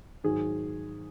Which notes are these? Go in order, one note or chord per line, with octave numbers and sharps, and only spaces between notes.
G#2 D#3 F#3 G#4